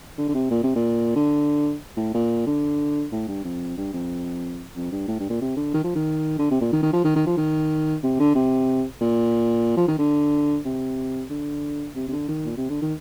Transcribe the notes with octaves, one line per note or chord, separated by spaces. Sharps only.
D3
D3
C3
A#2
C3
A#2
D3
A2
A#2
D3
A2
G2
F2
G2
F2
F2
G2
A2
G2
A#2
C3
D3
D#3
F3
D#3
D3
C3
A#2
D#3
D#3
F3
D#3
D#3
F3
D#3
C3
D3
C3
A#2
F3
D#3
D3
C3
D3
C3
C3
D3
D#3
A#2
C3
D3
D#3